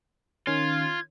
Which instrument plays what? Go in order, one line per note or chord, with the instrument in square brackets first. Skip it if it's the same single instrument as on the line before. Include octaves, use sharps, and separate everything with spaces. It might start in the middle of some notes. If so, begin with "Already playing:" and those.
[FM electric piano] D#3 C#4 [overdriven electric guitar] F4 [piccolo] G#6